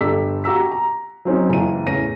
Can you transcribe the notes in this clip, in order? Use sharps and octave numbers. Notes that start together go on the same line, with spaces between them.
G1 G4 A4 E6 B6
F#4 G4 A#5 E6 B6
A#5
F#3 C4 C#4 D#4
F#1 C#2 E3 D#7
E2 A2 C#4 A#6 D#7